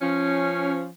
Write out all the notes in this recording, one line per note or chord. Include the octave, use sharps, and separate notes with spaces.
F3 C#4